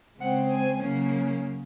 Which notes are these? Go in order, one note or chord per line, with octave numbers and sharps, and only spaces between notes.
C#3 G#3 C4 F#5
G#5
C#3 F#3 A#3 C#4